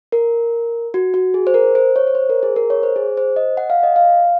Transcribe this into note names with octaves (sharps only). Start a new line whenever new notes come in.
A#4
F#4
F#4
G#4
C5
A#4
C5
C#5
C#5
C5
A#4
G#4
A#4
C#5
C5
G#4
C5
D#5
F#5
F5
D#5
F5